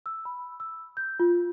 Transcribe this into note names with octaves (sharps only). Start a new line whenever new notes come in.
E6
B5
E6
G6
F4